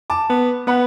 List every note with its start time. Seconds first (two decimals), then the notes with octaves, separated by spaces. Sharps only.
0.10 A5 D6
0.30 B3
0.67 B3 F#5 B5